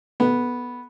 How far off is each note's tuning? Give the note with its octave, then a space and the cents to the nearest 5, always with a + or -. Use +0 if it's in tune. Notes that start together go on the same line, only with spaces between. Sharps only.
B3 -5 A4 -25